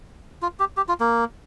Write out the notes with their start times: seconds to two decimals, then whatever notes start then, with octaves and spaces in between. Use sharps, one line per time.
0.42 F4
0.60 G4
0.77 G4
0.88 F4
1.00 A#3